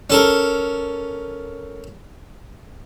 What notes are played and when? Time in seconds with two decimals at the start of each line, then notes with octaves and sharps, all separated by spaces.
0.10 C#4 A4 A#4